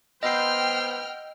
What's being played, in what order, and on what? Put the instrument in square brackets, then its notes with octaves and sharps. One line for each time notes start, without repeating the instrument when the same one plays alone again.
[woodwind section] B3 B4 C5 [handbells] D#5 E6 C7 [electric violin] G5 F6